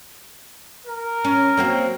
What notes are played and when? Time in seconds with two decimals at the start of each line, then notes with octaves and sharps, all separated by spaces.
0.86 A#4
1.25 C#4
1.57 F#3 A#3 C4